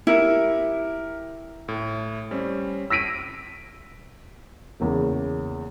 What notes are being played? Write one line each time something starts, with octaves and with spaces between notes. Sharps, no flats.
E4 G4 A#4 C#7
A2
G3 C4 C#4
E6 A#6 B6 D7 D#7
E2 C#3 A#3